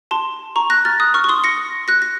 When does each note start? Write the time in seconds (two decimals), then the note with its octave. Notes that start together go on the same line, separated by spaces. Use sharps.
0.11 A5 C6
0.56 A#5 C#6
0.70 F#6 A#6
0.85 F6 A6
1.00 D#6 F#6
1.14 C#6 F6
1.24 C#6
1.29 C6 D#6
1.44 A#6 C#7
1.88 F#6 A#6
2.02 A#6